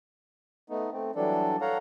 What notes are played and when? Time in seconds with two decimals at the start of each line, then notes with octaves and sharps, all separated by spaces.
0.70 A3 B3 D#4
0.93 A3 C4
1.16 E3 F#3 G3 D4 A4
1.61 A4 C#5 F5 F#5 A#5